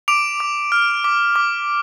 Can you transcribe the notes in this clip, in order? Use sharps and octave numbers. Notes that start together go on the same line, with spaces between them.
D6 D7 F7
D6
F6
D6
D6